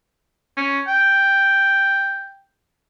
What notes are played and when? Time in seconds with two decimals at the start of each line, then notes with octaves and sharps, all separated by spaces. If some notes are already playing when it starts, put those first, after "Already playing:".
0.57 C#4
0.88 G5